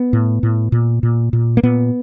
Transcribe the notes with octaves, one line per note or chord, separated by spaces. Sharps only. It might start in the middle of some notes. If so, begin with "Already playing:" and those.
Already playing: B3
A2
A2
A#2
A#2
A#2
A#3
A#2 B3